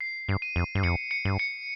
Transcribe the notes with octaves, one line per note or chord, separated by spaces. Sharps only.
C7
G2
D#7
F2
G2
F2 C#7
C#7
G2
C#7